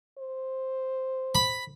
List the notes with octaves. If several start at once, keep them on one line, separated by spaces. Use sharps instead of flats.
C5
B5